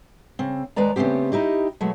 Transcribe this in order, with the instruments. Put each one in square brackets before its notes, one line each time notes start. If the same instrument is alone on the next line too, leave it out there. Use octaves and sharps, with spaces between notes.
[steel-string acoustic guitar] C#3 C4
D#2 G#3 B4 D5 A#5
C#3 A3 B3 C4 G4
D#4 E4 G4 D#5
B2 F#3 G#3 A3